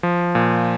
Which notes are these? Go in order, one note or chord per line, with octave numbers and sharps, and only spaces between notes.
F3
A#2